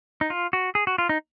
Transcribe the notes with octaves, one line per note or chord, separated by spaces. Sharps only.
D#4
F4
F#4
G#4
F#4
F4
D#4